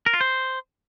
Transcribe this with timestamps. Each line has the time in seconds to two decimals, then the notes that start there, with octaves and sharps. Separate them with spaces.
0.06 A#4
0.13 F4
0.21 C5